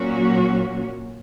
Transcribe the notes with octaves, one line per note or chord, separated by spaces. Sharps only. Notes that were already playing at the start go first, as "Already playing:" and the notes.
Already playing: A#2 F#3 A#3 C#4 F#4